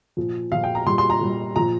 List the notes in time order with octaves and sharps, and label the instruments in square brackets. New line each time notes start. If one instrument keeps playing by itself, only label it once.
[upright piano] A#2 F3
A#2 F3 F5
G5
A#5
A#2 G3 C6
C6
A#5
A#2 G3
A#2 F3 A#5